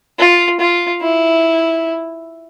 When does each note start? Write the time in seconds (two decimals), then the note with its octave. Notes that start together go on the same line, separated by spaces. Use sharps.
0.19 F4
0.60 F4
1.02 E4